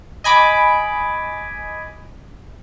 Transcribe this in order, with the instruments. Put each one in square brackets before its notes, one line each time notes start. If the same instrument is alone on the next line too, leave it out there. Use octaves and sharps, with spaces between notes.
[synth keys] D#5 G#5 B5 D6